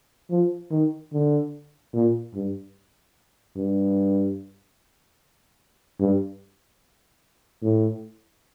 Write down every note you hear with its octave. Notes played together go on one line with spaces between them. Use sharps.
F3
D#3
D3
A#2
G2
G2
G2
A2